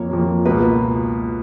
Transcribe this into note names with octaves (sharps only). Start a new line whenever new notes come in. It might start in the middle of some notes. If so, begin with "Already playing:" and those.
Already playing: F2 F3 A#3 C#5
F2 F3 A#3
C#2 B2 A#3 B4